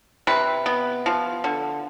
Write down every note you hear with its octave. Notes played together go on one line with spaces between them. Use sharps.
C3 B4
B3
F3
D3